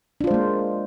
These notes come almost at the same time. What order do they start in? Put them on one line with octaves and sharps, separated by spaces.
D4 F4 C5 G#3 A#3